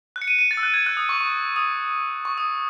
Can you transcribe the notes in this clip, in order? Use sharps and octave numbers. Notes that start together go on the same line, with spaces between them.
F#6
C#7
D#7
D#7
A6
E6
F#6
G#6
F#6
D#6
C#6
C#6
D#6
C#6
D#6